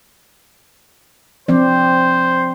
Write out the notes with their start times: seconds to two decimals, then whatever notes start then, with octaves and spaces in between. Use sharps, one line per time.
1.48 F3 C4 C5 D5